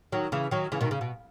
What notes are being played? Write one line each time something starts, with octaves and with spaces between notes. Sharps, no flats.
D#3 F#3
C#3 E3
D#3 F#3
C#3 E3
B2 D#3
C#3
B2